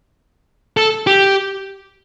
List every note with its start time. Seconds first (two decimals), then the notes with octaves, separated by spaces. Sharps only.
0.77 A4
1.07 G4